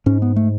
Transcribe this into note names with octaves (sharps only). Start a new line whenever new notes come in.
G#2 C#4
B3
A3